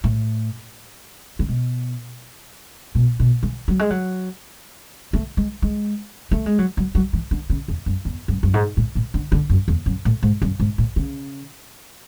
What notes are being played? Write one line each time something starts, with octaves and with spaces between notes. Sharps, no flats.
A2
C#3
B2
B2
B2
E3
F#3
G#3
F#3
A3
G#3
G#3
A3
G#3
F#3
F#3
F#3
E3
D3
C#3
E2
F#2
E2
F#2
F#2
G#2
A2
A2
D3
D3
F#2
E2
F#2
A2
G#2
F#2
G#2
A2
C#3